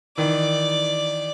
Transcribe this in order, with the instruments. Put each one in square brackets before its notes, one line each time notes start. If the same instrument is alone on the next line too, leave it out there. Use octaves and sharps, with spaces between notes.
[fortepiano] D#3 E3 [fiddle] D5